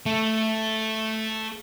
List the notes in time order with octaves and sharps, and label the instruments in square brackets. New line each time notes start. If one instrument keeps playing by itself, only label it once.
[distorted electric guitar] A3 A4